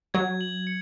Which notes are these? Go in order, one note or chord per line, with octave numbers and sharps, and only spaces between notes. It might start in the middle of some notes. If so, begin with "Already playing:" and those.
F#3 G#6
F#7
C#7